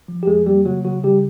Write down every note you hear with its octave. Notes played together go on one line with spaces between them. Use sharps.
F3
G4
F2 G#3 G#4
G3 A#3 G4
C#3 F#3 F#4
C#3 F#3 F#4
C#3 G3 G4